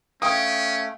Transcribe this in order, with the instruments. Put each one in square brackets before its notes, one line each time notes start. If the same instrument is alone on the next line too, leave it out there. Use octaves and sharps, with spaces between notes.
[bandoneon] A3 [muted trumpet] C#4 [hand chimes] F5 D7 [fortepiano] G5 D#6